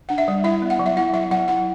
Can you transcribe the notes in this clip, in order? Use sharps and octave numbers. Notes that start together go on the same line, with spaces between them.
D4 F#5
E5
G3
E4 E5
B3
F#5
F#3
E5
E4 F#5
F#3 E5
F#3 F#5
E4 F#5